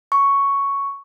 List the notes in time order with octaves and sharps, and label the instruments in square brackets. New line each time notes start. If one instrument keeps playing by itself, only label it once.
[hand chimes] C#6